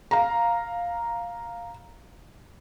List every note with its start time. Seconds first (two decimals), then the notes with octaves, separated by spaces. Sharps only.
0.11 F5 A#5